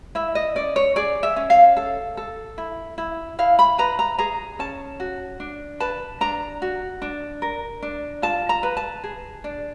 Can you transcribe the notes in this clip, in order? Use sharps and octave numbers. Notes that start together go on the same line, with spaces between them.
E4 E5
D#5
C#4 D5
C#5
G#4 D5
E5
C#4
F5
A4
A4
E4
E4
E4 F5
B5
B4 A#5
A#5
G#4 A#5
C#4 A5
F#4
D4
B4 A5
D4 A#5
F#4
D4
A#4
D4
F4 A5
A#5
B4
A5
G#4
D4